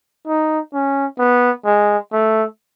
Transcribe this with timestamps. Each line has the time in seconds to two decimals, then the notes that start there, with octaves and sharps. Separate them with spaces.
0.27 D#4
0.73 C#4
1.19 B3
1.65 G#3
2.12 A3